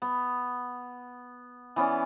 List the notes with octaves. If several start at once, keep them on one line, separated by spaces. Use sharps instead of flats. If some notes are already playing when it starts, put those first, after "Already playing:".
B3
E3 B3 C#4 D5